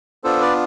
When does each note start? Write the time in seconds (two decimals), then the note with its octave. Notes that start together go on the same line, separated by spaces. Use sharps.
0.24 B3 D4 F4 A4 C5
0.41 B4 D5